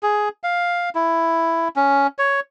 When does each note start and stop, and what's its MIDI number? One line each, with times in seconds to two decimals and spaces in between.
0.03 0.29 68
0.44 0.89 77
0.95 1.68 64
1.76 2.07 61
2.18 2.40 73